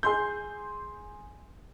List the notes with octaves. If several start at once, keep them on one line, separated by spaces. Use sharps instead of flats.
G#4 C6 G6